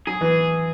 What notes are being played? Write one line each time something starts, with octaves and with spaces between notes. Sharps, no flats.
F#3 G#4
E3